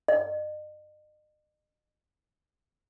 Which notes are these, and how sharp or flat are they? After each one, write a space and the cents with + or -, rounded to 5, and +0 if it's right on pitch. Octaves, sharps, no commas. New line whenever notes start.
D#5 -40